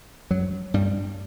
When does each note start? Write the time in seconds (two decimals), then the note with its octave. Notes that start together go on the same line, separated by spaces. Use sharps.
0.30 F#2 F#3
0.74 G2 G3